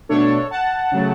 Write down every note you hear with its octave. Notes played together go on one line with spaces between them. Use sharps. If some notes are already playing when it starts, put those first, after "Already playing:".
B2 A3 D4 A4 C#5
F#5 A5
C#3 F#3 A3